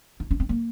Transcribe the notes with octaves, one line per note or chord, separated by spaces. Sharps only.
D#4
C#4
C4
A#3